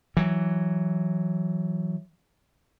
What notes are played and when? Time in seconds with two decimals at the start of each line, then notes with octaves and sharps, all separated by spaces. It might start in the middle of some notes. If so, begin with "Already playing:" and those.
0.17 E3 F#3